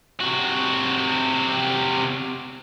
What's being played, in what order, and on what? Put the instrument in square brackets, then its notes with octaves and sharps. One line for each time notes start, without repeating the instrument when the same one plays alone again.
[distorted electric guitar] C3 F#4